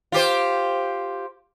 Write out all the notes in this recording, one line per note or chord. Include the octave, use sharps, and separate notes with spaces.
F4 G4 C5